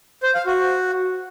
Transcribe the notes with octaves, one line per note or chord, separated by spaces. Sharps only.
C5
F5
F#4